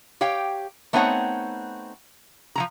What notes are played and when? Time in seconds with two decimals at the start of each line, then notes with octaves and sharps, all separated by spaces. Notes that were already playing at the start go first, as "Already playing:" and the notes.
0.21 G4 C#5 F5 G5
0.93 A3 B3 C4 D#4 C#5 F#5
2.56 F3 F#3 A#5